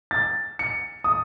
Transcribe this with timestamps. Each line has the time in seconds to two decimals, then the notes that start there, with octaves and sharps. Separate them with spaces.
0.11 A6
0.59 C#7
1.04 D#6